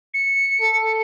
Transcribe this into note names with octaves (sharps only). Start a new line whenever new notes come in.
C#7
A4